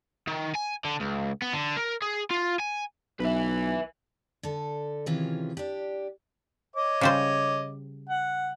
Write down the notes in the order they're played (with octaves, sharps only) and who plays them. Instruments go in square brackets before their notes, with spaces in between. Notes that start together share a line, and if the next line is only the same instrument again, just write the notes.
[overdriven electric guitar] D#3
G#5
D3
C#2
B3
D3
A#4
G#4
F4
G#5
[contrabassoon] B1 [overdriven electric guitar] B4 E5
[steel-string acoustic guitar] D3 A4
C3 D#3 E3 C#4 F4 G#4
D4 G4
[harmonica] C#5 D#5 D6
[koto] C#3 G3 C5
[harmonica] F#5